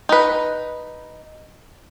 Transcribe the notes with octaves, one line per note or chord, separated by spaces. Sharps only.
D#4 B4